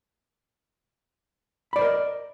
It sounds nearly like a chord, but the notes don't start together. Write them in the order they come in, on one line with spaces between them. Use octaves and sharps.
B5 D5 C5 A#4 D#5